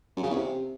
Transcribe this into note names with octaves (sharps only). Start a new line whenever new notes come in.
F#2
C#3
E2
C3